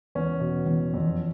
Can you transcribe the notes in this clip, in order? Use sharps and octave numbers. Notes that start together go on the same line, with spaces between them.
E2 C#4
B2
E2
F2